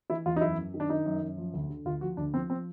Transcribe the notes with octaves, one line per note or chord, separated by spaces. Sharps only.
E3 E4
E2 F4
D#4
F#2 E4
F#2
D#3
D4
D#3 D#4
F#2
F#2
F3
D2
D3
D2 F4
F3 F#4
D2 D4
F3 C4
C4